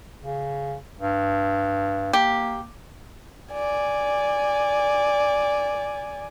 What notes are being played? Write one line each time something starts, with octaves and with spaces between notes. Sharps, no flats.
C#3
G2
A#3 G4
D5 G#5